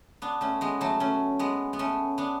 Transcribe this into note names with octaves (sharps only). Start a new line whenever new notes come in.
B3 D4
A3 C#4
G#3 B3
F#3 A3
A3 C#4
G#3 B3
B3
A3 C#4
B3 D4